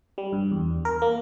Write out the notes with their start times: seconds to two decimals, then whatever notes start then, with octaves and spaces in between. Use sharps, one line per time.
0.18 G3
0.33 G2
0.52 E2
0.85 A#4
1.02 A#3